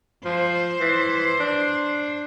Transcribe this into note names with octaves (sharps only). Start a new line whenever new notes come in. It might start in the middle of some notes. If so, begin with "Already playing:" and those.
F3 C5
E3
D4